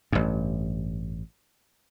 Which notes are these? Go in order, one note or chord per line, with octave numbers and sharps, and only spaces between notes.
A1 G2